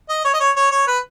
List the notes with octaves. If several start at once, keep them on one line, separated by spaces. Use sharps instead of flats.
D#5
C#5
D#5
C#5
C#5
C#5
B4